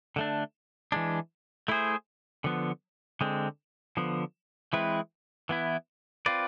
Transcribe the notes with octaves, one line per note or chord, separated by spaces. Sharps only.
D3 A3 D4
E3 G#3 D4
A3 E4 G#4 C5
D3 F3 B3
D3 G#3 C4
D3 F3 B3
E3 G#3 C4 E4 B4
E3 B3 E4
C4 F4 B4 D5